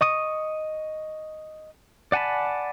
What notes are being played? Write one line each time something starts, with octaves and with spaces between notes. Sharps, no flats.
D#5 C#6 D#6
D5 F#5 G#5 A5 B5